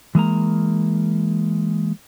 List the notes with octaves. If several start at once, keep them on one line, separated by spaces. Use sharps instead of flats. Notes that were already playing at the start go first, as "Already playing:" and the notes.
E3 G#3 A#3 A#5